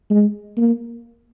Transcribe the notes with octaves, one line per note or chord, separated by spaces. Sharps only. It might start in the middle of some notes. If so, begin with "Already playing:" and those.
G#3
A#3